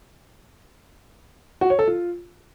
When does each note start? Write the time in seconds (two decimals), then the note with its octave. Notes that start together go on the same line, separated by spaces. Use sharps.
1.61 F#4
1.70 C#5
1.79 A4
1.88 F4